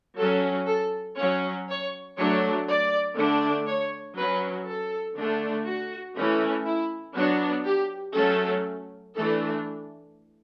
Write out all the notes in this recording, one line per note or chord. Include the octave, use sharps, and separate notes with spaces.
F#3 C#4 A4
A4
F#3 C#4 C#5
C#5
F#3 A3 D4 C#5
D5
D3 A3 D4
C#5
F#3 C#4 B4
A4
D3 A3 D4
F#4
E3 A3 C#4
E4
F#3 B3 D4 F#4
G4
F#3 A3 C#4 A4
E3 A3 D4 A4